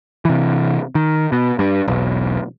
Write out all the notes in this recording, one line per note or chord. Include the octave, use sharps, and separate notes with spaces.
C3 E3
D#3
B2
G2
E1 B1